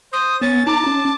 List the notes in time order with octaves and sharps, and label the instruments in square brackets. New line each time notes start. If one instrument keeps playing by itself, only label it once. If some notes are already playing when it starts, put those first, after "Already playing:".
[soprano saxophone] C5 [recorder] D#6
[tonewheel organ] B3 [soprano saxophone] C#4 [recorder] A6
[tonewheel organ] D#4 A#5 [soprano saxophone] A5 [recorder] D6
[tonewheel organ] C#4